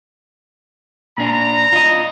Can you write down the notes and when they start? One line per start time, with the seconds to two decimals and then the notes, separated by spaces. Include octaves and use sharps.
1.18 A#2 D4 A#5
1.73 F4 D#5